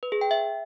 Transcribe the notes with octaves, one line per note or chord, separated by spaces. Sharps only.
B4
G#4
G5
E5